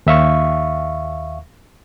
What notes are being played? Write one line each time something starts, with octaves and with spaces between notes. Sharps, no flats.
D#2 E5 F5 C#6